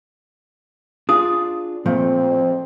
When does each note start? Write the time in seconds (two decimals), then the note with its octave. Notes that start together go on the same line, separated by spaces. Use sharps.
1.09 D4 F4 G#4 D#6
1.86 A#2 F3 A3 C4